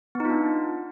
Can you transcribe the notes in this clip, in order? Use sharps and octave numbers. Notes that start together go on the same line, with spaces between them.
B3 D4 D#4 F4